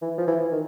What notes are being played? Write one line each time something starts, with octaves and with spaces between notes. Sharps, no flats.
E3
F3
E3
D#3